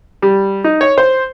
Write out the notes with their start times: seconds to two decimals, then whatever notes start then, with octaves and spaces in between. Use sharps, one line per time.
0.22 G3
0.64 D#4
0.81 C#5
0.98 C5